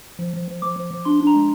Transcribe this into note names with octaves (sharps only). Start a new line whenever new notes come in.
F3
F3
F3
F3 D6
F3
F3
D4 C6
D4
A#5
G#3